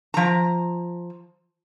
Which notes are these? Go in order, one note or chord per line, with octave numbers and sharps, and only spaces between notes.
F3 A#5